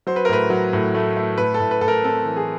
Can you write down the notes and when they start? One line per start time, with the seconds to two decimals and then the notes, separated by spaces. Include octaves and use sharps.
0.07 F#3 C5
0.16 B4
0.25 A#4
0.29 A2 B4
0.50 F#3
0.73 A2
0.94 A3
1.17 A3
1.38 A2 B4
1.54 A4
1.60 A2
1.71 B4
1.81 A2 A4
1.88 A#4
2.03 C4 A4
2.25 E3
2.36 G#4